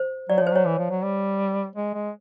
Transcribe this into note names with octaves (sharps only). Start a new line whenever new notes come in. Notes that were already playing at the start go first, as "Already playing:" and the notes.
Already playing: C5
F#3 D5
F3 C#5
C5
F#3 C#5
E3
F3
F#3
G3
G#3
G#3